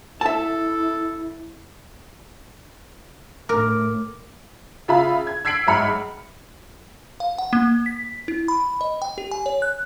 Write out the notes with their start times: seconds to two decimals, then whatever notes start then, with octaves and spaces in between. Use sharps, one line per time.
0.21 E4 A4 E5 A5
3.49 A2 A3 A#4 D6
4.88 C#3 F4 E5 F5 B5
5.27 G#6
5.45 E6 G#6 B6 C7 D7 F#7
5.67 B1 G#2 E5 B5 F6 C#7
7.20 F5
7.38 F#5
7.53 A#3
7.86 B6
8.28 E4
8.48 B5
8.81 D#5
9.02 G5
9.18 G4
9.31 G#5
9.46 C#5
9.62 F#6